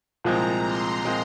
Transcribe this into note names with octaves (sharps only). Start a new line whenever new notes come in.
C2 A#2 F3 G#3 C4 A#5
C6
A#2 F3 G#3 C4